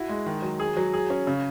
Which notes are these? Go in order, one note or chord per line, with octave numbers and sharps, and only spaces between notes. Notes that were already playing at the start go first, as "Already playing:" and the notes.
Already playing: E4 F#4
G#3
D#3
F#3
G#4
F#3
G#4
C#4
C#3